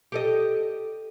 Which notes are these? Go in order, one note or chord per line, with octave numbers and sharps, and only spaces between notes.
G4 A4 D#5